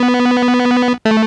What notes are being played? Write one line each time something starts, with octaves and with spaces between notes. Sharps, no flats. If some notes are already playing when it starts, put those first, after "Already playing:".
Already playing: B3
A3